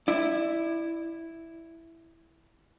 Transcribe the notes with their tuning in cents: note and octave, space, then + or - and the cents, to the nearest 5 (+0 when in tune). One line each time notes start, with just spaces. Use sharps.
E4 +0 D5 +35